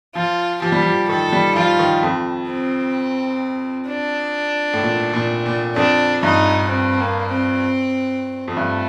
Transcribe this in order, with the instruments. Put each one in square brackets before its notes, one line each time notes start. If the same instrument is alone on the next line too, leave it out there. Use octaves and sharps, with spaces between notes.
[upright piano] F3 [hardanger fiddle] F4
[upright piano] F3 [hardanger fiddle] G4
[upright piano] G3
F3
[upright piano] D#3 [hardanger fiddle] A4
[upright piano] G3
[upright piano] F3 [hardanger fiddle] F4
[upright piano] D#3
F2
[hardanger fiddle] C4
D4
[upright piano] A2
A#2
A#2
A#2
[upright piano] F2 [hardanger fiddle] D4
[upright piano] G2 [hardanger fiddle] D#4
[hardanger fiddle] C4
A#3
C4
[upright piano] F2
[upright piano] G2 [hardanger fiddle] A3